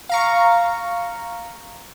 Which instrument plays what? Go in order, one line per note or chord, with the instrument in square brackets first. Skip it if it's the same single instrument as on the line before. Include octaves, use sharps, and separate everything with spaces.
[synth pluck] F5 A#5 C#6